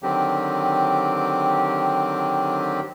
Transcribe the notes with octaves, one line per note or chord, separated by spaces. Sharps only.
D3 D#3 F#3 C4 G4